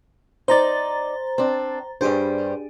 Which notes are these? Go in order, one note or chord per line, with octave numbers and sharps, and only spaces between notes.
D#4 C5 D5 A#5 A6
C4 D4
G2 G3 D4 G4 G#4 C5